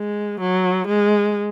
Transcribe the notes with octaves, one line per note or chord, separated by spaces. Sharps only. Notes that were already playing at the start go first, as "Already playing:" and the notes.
Already playing: G#3
F#3
G#3